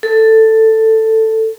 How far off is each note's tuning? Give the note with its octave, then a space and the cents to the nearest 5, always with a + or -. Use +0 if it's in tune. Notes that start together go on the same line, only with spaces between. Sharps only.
A4 +10